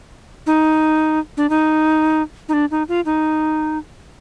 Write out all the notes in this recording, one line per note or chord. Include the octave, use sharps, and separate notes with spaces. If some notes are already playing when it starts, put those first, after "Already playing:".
D#4
D4
D#4
D#4
D4
D#4
F4
D#4